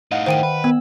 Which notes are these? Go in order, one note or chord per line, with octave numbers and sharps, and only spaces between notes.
A2 D#4 D#5 F5 F#5
D#3 C5 G5 D#7
B4
B3 E6